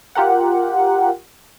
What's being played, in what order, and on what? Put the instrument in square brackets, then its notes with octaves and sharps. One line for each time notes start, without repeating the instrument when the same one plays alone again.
[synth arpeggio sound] F4 G4 A#4 F#5